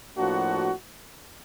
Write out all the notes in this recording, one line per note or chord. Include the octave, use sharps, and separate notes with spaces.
A2 F3 A#3 D4 F#4